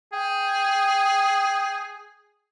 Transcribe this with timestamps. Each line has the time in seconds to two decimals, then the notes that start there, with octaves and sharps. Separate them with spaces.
0.13 G#4 G5